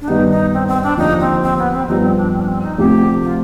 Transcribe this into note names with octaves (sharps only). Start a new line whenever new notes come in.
D4
G2 D#3 B3 D#4
D#4
C4
C4
D4
D#2 D3 F3 D#4
C4
C4
B3
C4
G2 F3 B3 D#4
C4
D4
C4
D4
C4
D#4
D2 C3 F3 C4 G4
F4